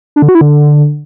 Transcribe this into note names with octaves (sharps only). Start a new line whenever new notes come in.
D4
D3
F#4
E4
D3